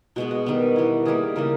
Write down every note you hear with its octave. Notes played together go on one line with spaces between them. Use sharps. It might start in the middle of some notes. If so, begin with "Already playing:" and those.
B2 G#3 B3 F#4
F#4
D#3 G3 B3
E3 G3 B3
D#3 G3 A#3 G#4
C#3 E3 G3 A#3 A#4